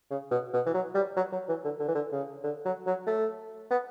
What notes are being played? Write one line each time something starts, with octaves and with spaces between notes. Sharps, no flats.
C#3
B2
B2
E3
F#3
G3
F#3
F#3
E3
D3
D3
E3
D3
C#3
D3
F#3
F#3
A3
B3